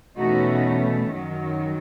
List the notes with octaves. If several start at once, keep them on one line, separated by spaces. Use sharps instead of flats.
E2 B2 A3 C#4 D#4 F#4
F#2 D#3 F#3